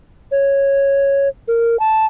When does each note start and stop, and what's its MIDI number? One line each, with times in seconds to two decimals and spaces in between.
0.31 1.28 73
1.48 1.79 70
1.80 2.06 81